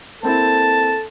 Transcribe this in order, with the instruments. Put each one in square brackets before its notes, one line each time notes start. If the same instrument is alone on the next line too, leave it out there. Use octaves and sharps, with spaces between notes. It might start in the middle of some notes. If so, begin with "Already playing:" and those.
[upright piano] A#3 C4 E4 [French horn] A4 [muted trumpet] A5